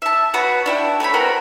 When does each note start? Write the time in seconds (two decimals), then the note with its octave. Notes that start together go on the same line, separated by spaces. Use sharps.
0.02 E5 A5
0.34 B3 F#4 B4 C#5
0.66 D4 E4 G5
1.00 A3 A4 C#5 B5
1.14 B3 C4 F#4 A#4